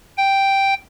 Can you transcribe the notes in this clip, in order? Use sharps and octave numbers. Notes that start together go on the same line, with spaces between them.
G5